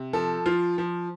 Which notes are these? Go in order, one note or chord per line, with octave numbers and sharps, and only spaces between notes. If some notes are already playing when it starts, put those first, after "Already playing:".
Already playing: C3
F3 A4
F3 F4
F3